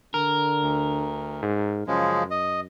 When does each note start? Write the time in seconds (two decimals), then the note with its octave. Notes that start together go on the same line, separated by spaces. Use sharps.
0.14 D3 A#4
0.61 D2
1.42 G#2
1.87 F#2 C#3 F3 G#3
2.31 D#5